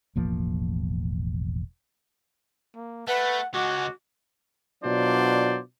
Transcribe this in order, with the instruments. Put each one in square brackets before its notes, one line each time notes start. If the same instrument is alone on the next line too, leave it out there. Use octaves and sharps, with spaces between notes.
[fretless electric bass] E1 A1 F3 A#3
[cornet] A#3
[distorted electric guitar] A3 [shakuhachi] B4 [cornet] F#5
[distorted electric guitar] C#2 G#3 [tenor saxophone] F#4 [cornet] F#5 [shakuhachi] D6
[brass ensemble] B2 F#3 D4 F4 C5 D5